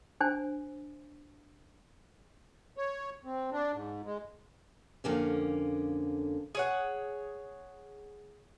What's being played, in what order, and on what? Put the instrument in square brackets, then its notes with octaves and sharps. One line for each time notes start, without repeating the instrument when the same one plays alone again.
[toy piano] D4 C5 G#5
[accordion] C#5
C4
D4
G#2
G#3
[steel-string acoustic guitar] F2 D3 A#3 C#4
[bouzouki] G#4 C#5 F#5